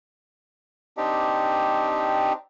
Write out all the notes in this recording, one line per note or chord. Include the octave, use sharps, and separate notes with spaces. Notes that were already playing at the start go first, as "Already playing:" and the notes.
C4 D4 D#4 G4